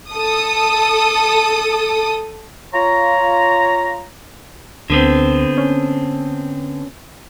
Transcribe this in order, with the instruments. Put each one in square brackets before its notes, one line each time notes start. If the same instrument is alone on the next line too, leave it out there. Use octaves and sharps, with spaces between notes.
[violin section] A4 D#6
[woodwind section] F4 C#5 A#5
[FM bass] D2 [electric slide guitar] D3 B3 C4
[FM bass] C#4